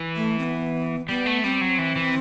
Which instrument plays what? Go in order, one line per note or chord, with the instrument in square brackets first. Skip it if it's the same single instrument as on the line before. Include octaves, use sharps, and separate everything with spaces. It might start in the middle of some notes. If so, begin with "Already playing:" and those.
Already playing: [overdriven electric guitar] E3
[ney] A3
C4
B3
[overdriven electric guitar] G3 [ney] B3
[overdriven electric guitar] A3
[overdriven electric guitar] G3 [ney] C4
[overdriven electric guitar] F#3
E3
E3